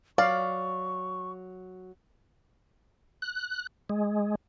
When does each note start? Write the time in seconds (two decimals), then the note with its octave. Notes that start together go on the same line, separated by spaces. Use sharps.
0.18 F#3 D5 F5 C#6
3.22 F#6
3.90 G#3